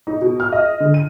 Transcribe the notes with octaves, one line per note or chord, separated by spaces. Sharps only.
D#4
B2
F6
D#5
D3
D#7